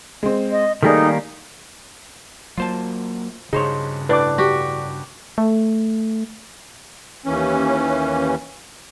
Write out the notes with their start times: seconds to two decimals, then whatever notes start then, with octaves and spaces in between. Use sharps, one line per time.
0.23 G#3 C4
0.51 D#5
0.83 D#3 G3 A3 A#3 D#4 G#4 D5
2.58 F#3 A#3 F4 C5 A5
3.53 G2 C#3 D#4 G#4 C5 C#5 C6
4.09 A2 D4 B4 D5 D6
4.38 F#4 G4
5.38 A3
7.26 D#2 E3 C#4